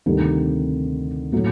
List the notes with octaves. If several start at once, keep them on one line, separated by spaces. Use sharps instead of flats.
D2 C3 D#3 G3
A2 F#3 A3